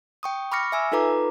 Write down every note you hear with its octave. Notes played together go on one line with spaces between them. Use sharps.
G5 C#6 D#6
B5 C#6 D6 F6 A#6 C#7
E5 G#5 E6
D#4 F4 A4 B4 A#5 D6